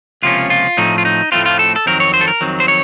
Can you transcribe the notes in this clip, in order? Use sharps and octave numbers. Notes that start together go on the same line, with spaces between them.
C#2 C3 F3 A#3 C#4 F4
F4
A2 F3 A3 C4 D#4
F4
D#4
A2 F3 A3 C4 F4
F4
A4
A4
F2 D#3 F#3 C4 A#4
C#5
C5
A4
A#4
F2 D#3 F#3 C4
C5
C#5